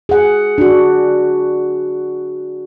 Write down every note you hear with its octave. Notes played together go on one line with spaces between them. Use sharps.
G#4 F#5
D4 F#4